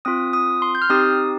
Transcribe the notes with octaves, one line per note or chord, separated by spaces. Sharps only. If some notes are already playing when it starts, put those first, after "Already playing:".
C4 F4 D#6
D#6
C6
G6
F6
C4 D#4 G4 D#6